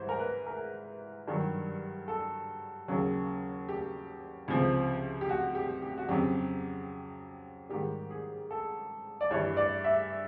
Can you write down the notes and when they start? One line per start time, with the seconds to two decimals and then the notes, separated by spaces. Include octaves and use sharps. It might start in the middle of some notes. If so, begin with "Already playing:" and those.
Already playing: G#2 E3 G3 C5
0.09 A#4
0.20 B4
0.46 A#4
1.28 G2 D#3 F#3
2.08 A4
2.88 D#2 C#3 F#3
3.69 G4
4.48 C#2 C3 F3
5.21 G4
5.29 F#4
5.55 G4
5.82 G4
5.98 F#4
6.09 F2 C#3 F#3 G4
7.69 G#2 D#3 G3 G4
8.11 G#4
8.51 A4
9.21 D5
9.31 G2 E3 G3 C#5
9.57 D5
9.84 E5